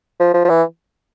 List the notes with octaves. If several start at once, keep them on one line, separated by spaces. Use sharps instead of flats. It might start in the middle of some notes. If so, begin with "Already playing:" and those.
F3
F3
F3
E3